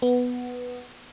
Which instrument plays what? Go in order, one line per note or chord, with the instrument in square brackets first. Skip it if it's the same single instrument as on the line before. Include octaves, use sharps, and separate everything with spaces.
[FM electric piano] B3